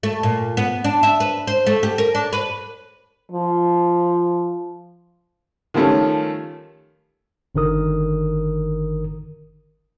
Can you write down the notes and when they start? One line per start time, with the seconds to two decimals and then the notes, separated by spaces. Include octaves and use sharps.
0.03 A3
0.23 A#2
0.57 B3
0.84 D4
1.03 E5
1.20 B4
1.47 C5
1.66 A3
1.83 G4
1.98 A#4
2.15 D4
2.33 B4
3.32 F3
5.74 D#3 F3 G3 A3 C#4
7.55 G1 D3 D#3 A#4 D#6